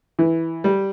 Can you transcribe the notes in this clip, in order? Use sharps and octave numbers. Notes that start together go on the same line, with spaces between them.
E3
G3